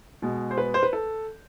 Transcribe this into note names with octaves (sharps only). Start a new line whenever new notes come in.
B2 G#3
C5
B4
C5
B4
A4